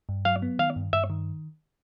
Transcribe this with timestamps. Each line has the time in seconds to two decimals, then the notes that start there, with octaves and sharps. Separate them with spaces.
0.09 G2
0.25 F#3 F5
0.42 B3
0.59 D#3 F5
0.76 G2
0.93 G2 E5
1.10 D#3